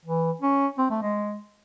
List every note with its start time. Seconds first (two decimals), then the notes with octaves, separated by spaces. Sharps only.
0.05 E3
0.42 C#4
0.78 C4
0.90 A3
1.02 G#3